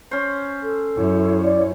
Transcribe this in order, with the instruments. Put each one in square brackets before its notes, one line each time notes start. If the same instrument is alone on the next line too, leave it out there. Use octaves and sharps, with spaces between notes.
[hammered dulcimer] C#4 C5
[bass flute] A4
[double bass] F#2 [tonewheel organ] E4 C#5
[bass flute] D5